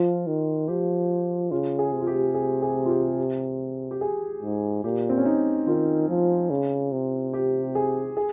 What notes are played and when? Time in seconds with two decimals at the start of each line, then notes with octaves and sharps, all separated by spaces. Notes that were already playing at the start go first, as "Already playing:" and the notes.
Already playing: F3 F4
0.27 D#3
0.68 F3 G4
1.51 C#3 F4
1.79 G#4
1.93 C3
2.01 F4
2.07 G4
2.34 G#4
2.62 G#4
2.86 F4
2.90 G4
3.91 G4
4.01 G#4
4.42 G#2
4.84 A#2 G4
5.09 C4
5.18 C#4
5.25 D#4
5.67 D#3 F4
6.08 F3
6.50 C#3
6.92 C3
7.34 G4
7.75 G#4
8.17 G#4